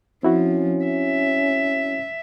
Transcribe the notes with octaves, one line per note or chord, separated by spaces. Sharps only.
F3 C4 C#4 E4 F#4
E5